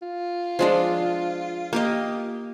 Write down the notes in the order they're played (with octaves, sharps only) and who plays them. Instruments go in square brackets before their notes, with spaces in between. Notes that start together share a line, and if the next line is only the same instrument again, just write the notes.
[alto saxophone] F4
[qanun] F3 G#3 D4
A#3 G4 D#5